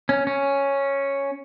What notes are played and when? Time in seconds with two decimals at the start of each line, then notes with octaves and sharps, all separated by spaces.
0.09 C#4
0.27 C#4